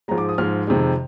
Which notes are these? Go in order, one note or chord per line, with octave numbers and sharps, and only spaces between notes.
G#2 F3 G#3 A#5
D6
D#6
G#2 F3 G#3 F6
F2 C3 D#3 G#3